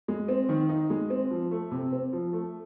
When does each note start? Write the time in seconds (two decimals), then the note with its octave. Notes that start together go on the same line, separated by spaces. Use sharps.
0.08 G#3
0.28 C4
0.49 D#3
0.69 D#4
0.90 G#3
1.10 C4
1.31 F3
1.51 A3
1.71 C3
1.92 C4
2.13 F3
2.33 A3